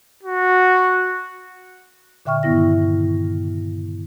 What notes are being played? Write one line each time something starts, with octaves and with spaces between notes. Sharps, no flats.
F#4
A#2 D3 E5 G5 C#6 F6
G2 D#3 B3 E4 A#6